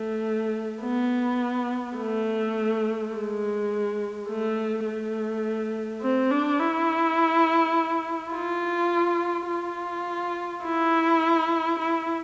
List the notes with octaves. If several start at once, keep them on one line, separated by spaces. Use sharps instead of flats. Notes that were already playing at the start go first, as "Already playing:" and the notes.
Already playing: A3
B3
A3
G#3
A3
A3
C4
D4
E4
F4
F4
E4
E4